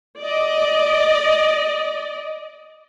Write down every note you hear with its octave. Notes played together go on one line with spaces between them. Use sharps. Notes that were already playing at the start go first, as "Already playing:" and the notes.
D5 D#5